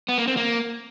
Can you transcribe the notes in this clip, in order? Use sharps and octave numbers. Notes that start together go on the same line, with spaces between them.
B3
A#3
C4
A#3